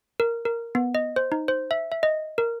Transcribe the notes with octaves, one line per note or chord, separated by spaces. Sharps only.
A#4
A#4
B3
D#5
C5
D#4
C5
E5
E5
D#5
A#4